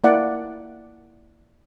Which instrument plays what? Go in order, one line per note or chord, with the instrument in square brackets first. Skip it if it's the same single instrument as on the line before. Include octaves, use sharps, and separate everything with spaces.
[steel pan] A#3 E4 D5 F#5